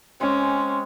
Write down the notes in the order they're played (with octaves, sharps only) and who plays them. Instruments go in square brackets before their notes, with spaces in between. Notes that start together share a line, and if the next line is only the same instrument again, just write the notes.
[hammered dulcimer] G#3 C4 [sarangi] C#4